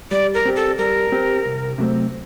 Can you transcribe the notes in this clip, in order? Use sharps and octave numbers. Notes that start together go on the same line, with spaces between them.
G3 D5
A#4
C4 G4
A4
G3 A#4
C4 G4
C2
C3 F#3 A3 C4